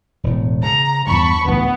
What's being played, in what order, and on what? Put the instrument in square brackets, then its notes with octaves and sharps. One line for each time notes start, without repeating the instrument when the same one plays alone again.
[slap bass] E1 A2
[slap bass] C#3 [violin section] A#5
[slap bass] E2 G2 [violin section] A5 B5 C#6
[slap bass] A1 D2 [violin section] B3